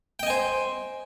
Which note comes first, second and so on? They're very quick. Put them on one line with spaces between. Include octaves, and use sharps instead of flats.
G5 D#5 G#5 C5